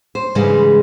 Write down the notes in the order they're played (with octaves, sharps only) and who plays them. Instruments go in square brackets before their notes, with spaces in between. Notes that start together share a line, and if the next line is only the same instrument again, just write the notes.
[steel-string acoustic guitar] C5
G#2 C#3 E3 G3 G#3